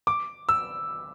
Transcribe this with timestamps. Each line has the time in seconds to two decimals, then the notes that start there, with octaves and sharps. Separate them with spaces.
0.07 D6
0.49 E6